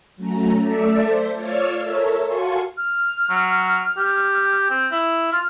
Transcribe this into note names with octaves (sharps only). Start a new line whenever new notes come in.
F#3 A3 C#4 A#5
A3 A4 D5 E5
C5
F4 C#5 D5 C#6 E6 F6
A4 A#4 C#5 E5
F#4 F5 G#5 A5 C6 C#6
F6
F#3
G4
C4
E4
F4 F6